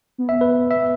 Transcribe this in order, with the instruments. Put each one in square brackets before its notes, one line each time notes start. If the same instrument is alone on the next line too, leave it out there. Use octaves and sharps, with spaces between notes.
[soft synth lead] B3
[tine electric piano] E5
B4
E5